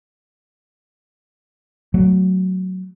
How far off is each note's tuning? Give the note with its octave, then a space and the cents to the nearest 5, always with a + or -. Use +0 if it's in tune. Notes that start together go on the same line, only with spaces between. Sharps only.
F#3 +5 A3 +0